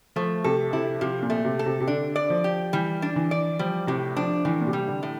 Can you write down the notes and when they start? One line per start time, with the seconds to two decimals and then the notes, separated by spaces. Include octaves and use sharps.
0.16 F3 A3
0.44 C3 A4
0.73 C3 E4
1.01 C3 F3
1.23 A#2
1.30 A3
1.45 C3
1.59 A4
1.66 C3
1.80 C3
1.87 D3 D4
2.16 D5
2.30 F3
2.44 G4
2.73 E3 G3
3.02 D4
3.16 E3
3.31 D5
3.59 F3 G3
3.87 A2 C3
4.16 F3 D4
4.45 A2 E3
4.61 A#2
4.67 C3
4.73 G3
4.88 D3
5.03 A2